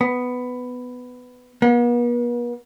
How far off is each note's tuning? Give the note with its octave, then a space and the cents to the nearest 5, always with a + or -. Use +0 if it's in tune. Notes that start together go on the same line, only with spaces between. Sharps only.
B3 +10
B3 -45